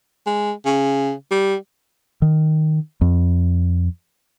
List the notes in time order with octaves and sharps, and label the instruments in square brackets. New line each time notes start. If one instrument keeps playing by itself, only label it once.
[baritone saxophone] G#3
C#3
G3
[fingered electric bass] D#3
F2